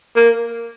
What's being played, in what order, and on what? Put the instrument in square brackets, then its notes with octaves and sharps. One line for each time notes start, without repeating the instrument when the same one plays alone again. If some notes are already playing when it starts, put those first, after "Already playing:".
[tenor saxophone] A#3